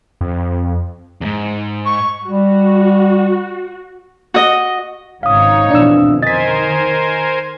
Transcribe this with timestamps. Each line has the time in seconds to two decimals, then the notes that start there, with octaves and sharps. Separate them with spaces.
0.21 F2
1.21 E2 G#2
1.86 C#6
2.25 G3 F#4
4.34 F#4 D#5
5.23 G#1 G#2 C#3 D#4 C#5 F5 D#6
5.70 F2 B2 E3 D4 E6
6.22 D#3 A#4 C5 D#5 G#5 A6 B6